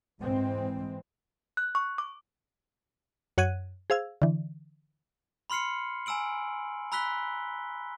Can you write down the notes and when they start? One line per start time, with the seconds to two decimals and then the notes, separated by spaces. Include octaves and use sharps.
0.20 G#2 E3 G#3 C4
1.57 F#6
1.75 C#6
1.98 D6
3.38 F#2 C#5 F#5 F#6 G#6 D#7
3.90 G#4 C5 F5 E6 G#6
4.22 D3 E3
5.50 B5 C6 F6 C7 C#7
6.06 G#5 A#5 E6 D7 F#7
6.92 A#5 B5 E6 F#6 B6 G7